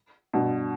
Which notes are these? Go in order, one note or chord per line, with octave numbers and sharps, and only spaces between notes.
G2 B2